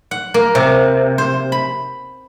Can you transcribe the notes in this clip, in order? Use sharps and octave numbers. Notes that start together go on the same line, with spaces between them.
F#5
A#3
C3
C5
B5